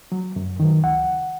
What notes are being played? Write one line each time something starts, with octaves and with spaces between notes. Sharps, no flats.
F#3
F#2
D#3 F#3
C#2 F#5